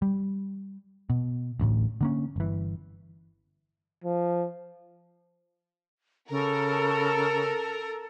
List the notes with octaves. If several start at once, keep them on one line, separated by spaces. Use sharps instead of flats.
G3
B2
A1 D2 A2
D3 A#3 C#4
G1 E3
F3
C#3 A4 A#4